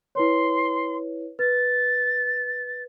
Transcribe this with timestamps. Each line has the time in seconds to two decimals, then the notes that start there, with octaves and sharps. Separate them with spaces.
0.15 E4 B4 C#5 C6
1.39 B4 A6